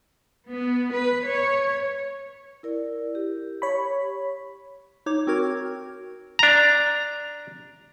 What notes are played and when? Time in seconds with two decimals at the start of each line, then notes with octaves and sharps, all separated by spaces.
0.48 B3
0.92 B4
1.27 C#5
2.63 E4 A#4 D5
3.15 G4
3.62 C#5 B5
5.06 D#4 C#5 D6
5.27 C4 F#4 A#4 G#6
6.39 D4 A#5